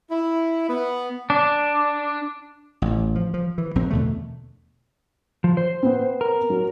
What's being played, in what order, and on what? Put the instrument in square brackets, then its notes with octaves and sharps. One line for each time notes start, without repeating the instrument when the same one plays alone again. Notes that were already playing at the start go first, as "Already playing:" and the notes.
[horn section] E4
B3
[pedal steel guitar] D4
[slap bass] A1
F3
F3
E3
A#1 F#3 C4
E2 B2 D3 A3
[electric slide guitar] F3
C5
[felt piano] B3 C4
[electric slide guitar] A#4
[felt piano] F#3